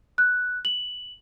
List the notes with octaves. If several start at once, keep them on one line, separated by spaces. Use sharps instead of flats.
F#6
F#7